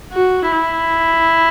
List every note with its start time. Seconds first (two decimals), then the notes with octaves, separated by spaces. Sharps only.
0.13 F#4
0.52 E4